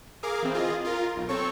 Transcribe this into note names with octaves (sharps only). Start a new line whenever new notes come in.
G#4 A#4 F5 D6
E3 C4
F4 G#4 D#5
F4 A#4
B1
C4 A4 C#5 C#6